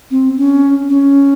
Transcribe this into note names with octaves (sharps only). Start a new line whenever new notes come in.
C4
C#4
C#4